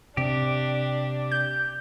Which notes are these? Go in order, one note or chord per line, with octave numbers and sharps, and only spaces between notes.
C3 C4 D4 G4
G6